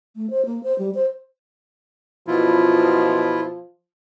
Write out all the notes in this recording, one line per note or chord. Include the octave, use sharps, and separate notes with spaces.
A3
C5
A#3
C5
G3
C5
F#2 B2 F3 E4 F4